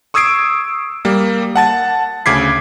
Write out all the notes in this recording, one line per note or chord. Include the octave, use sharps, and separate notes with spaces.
C#6 D#6 E6 G#6 C7 D7
G3 A#3
F#5 A5 A6
D2 C#3 D6 G#6 B6 C7